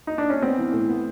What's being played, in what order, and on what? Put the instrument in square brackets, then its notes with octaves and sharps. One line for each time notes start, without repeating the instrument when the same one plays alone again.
[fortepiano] D#4
D4
C#4
[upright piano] B3 [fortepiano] C4
[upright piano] E3
A2
B3